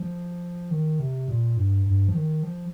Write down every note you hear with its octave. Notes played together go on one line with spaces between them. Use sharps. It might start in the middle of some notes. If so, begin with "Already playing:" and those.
Already playing: F3
D#3
C3
A#2
G2
G2
F3
D#3
F3